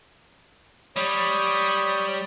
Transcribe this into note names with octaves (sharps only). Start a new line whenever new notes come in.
G3 C#5 B5 D#6